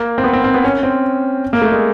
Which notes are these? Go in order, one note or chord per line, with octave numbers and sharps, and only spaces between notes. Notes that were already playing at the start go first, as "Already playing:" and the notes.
Already playing: A#3
C4
B3
C4
C4
B3
C#4
C4
A#3
A3
G#3